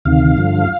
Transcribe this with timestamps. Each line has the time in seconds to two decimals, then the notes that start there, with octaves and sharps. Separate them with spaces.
0.05 D2 C3 D#3 F5
0.37 G2 D3 F3